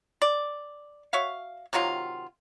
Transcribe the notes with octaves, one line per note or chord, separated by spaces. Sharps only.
D5
F#4 C#5 E5 F5
C3 D#3 F#3 F4